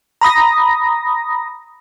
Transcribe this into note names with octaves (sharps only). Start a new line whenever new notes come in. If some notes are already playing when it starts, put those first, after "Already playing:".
A#5 B5 D#6 A#6